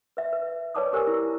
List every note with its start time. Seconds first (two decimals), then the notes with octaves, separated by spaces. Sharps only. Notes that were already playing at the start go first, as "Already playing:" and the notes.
0.17 B4 E5
0.33 B4
0.75 B4 C#5 D5 A5 D6 D#6
0.93 G4 A#4 C5 G#5 E6
1.07 E4